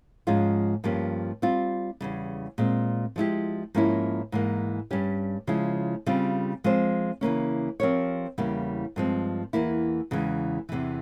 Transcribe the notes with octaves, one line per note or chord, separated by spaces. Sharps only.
G#2 F3 G#3 C#4 F4
G2 F3 A#3 C#4 G4
G3 C4 F4
E2 C#3 G3
A#2 G#3 C4
F3 G#3 E4 G4
G#2 F3 A#3 C#4 E4
G#2 E3 A#3
G2 G3 C#4 G4
C#3 F3 G#3 E4
C#3 G3 C4 F4
F3 G#3 C4 F4 C5
C#3 E3 A#3 C#4
F3 C4 G4 A#4 C#5
E2 C#3 G3 A#3 E4
G2 F3 G#3 C4
E2 E3 A#3 E4
E2 C#3 E3 G#3
E2 C3 E3